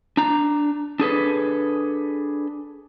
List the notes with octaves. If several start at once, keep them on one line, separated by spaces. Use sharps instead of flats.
D4 A#5
D4 G#4 A4 B4